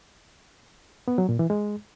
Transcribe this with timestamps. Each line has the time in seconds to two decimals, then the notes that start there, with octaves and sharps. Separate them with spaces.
1.08 B3
1.18 F#3
1.29 A#2
1.39 E3
1.50 G#3